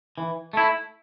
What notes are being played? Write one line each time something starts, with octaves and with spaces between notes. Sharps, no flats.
E3
A3 E4